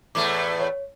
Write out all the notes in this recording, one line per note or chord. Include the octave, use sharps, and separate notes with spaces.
E2 A2 A3 D6
C#5